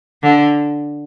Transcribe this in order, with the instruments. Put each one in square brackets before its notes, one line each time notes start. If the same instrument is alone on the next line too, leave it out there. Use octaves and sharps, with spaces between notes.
[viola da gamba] D3